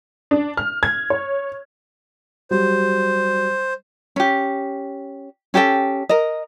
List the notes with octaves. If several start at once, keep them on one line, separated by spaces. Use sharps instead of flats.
D4
F6
G#6
C#5
F#3 G3 C5
C#4 G4
C#4 G4 A4 G5
A#4 D#5